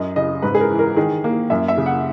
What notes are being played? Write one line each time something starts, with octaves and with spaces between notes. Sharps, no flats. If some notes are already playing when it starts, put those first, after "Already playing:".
Already playing: F#2 D#5
C#3 D#5
G#2 B4
G#4
A#4
E3
A#4
D#3 G#4
A#3
F#2 E5
E5
C#3
F#5